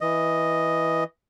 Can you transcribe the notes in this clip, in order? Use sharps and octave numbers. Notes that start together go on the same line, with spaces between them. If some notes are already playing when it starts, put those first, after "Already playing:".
E3 D#5